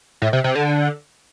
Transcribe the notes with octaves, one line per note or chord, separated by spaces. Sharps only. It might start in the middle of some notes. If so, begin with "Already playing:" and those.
A2
C3
C3
D3